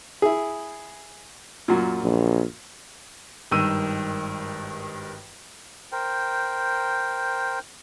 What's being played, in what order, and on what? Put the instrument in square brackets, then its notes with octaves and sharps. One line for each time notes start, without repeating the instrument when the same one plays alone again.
[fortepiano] E4 G#4
F#2 A#2
[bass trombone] A#1
[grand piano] G#1 G2 D#3 E6 D#7
[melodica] A#4 C5 G5